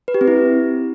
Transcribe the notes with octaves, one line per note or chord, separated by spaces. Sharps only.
B4
G4
C4
E4